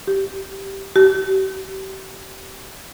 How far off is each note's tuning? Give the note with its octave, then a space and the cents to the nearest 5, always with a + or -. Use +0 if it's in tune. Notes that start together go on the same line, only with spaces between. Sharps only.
G4 -5
G4 -35